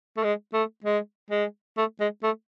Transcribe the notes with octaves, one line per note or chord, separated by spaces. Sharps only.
A3
G#3
A3
G#3
G#3
A3
G#3
A3